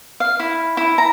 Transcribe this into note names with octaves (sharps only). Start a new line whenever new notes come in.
F5
E4
E4
A#5